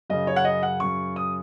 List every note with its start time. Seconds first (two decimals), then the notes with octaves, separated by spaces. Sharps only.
0.10 F#2 C#3 D#5
0.27 C#5
0.36 F#5
0.45 D#5
0.63 F#5
0.80 F#2 C#3 C#6
1.16 D#6